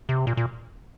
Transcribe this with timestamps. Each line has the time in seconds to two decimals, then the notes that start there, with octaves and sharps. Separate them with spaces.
0.09 C3
0.27 A#2
0.37 A#2